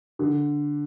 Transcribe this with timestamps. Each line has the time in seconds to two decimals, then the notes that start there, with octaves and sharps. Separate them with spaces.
0.19 D3